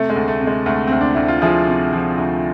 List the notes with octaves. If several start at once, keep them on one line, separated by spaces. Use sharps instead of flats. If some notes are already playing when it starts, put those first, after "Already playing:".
Already playing: C3 A3
G#3
D2
A3
C3
G#3
D2 A3
D2 C4
D4
D2 E4
F4
F3 E4 G#4
C3
F3
D2